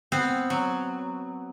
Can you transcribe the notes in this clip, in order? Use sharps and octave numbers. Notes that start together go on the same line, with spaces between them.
B3 C4
F#3